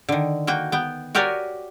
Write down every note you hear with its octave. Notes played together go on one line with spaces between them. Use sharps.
D3 D#3
A#3 F#4 G5
B3 G5
F#4 G4 A#4 C#5 D5 G#5